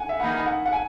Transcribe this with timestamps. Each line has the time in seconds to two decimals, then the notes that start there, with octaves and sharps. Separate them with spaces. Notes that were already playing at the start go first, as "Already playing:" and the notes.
Already playing: F#5 G#5
0.09 E5
0.20 D#3 A#3 D#4 G#4 B4 F#5
0.46 F#5
0.66 F#5
0.73 G#5